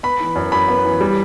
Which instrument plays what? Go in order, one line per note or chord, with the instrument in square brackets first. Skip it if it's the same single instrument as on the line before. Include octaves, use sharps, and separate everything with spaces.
[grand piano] B3 B5
E3
F#2
F#2 B5
B3
E3
G3